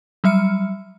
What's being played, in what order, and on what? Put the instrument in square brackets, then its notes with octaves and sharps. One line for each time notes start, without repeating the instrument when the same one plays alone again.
[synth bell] F#3 G3 E5 F6 C#7